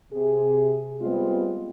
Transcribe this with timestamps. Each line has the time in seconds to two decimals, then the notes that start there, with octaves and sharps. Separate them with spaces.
0.11 C3 G#4
1.01 G3 G#3 B3 C4 F4